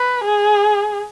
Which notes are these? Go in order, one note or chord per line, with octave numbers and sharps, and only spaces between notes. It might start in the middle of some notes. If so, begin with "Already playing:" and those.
Already playing: B4
G#4